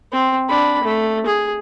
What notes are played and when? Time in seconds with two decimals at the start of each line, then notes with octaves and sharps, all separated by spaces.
0.12 C4
0.49 D4 B5
0.83 A3
1.26 G#4